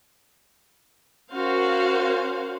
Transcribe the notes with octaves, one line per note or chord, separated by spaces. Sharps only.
C#4 F#4 A#4 C5 F5